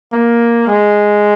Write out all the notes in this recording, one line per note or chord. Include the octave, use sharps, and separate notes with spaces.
A#3
G#3